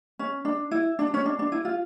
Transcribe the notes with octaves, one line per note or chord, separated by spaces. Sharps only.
C#4
D4
E4
D4
C#4
D4
D4
E4
F4